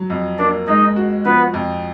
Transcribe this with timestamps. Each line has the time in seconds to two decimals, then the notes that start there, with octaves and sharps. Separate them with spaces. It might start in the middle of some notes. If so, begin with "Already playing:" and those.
Already playing: F#3
0.10 F2
0.38 A#3 D4 D5
0.67 G#3 D#4 D#5
0.96 F#4
1.25 F3 B3 B4
1.54 F2